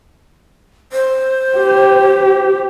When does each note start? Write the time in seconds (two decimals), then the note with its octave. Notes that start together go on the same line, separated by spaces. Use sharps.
0.93 C5
1.58 G4